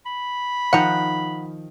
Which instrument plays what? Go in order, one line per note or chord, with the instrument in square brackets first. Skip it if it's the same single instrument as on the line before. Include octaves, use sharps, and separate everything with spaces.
[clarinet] B5
[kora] D#3 F3 G5 [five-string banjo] F#5 A#5